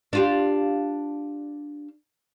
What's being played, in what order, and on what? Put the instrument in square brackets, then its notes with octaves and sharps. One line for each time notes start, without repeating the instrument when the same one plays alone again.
[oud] D4 F4 G4